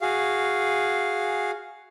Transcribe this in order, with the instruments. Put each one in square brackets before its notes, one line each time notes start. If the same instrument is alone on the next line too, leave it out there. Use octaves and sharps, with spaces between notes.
[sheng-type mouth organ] F#4 G#4 F5